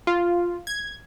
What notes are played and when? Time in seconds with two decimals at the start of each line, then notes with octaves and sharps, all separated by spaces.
0.07 F4
0.67 G#6